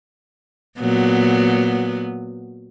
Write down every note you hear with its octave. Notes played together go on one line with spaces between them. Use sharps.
A#2 F#3 B3